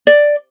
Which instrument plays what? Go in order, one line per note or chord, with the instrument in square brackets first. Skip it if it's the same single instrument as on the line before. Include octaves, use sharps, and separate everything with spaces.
[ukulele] D5